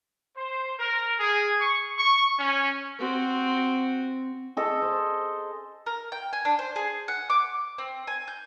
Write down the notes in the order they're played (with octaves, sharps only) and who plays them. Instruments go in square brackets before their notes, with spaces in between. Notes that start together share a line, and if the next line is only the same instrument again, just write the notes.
[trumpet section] C5
A#4
G#4
C#6
C#6
C#4
[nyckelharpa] C4 F#4
[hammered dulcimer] G#4 A4 D#5
C5
[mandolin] A#4
G5
G#5
D4
C5
G#4
F#5
D6
C4
G#5
G6